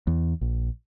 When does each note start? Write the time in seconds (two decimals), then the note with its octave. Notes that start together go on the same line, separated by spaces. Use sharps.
0.07 E2
0.41 A#1